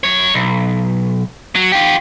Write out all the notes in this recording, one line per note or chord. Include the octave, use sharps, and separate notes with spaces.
F#2 C#5
B1
F#3
F4 G4